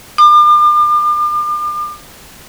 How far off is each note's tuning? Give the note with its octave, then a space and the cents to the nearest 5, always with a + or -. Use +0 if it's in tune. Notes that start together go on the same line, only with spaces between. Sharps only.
D6 +40